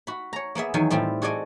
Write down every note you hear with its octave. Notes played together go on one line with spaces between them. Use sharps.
F#4 B5
C#5 A#5
A#3 B3 G#4 E5
E2 D#3 F#3 G#5
A2 G3 C4 E4 F4
F#4 G#4 A4 D5 D#5 G#5